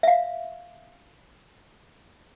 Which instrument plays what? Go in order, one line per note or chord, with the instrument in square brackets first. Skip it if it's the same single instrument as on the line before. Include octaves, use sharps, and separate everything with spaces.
[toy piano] E5 F5